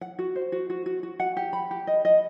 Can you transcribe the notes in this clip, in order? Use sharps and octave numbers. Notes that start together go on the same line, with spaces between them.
F#5
F#4
C5
F#4
F#4
F#4
F#4
F#5
G4
B5
G4
D#5
D#5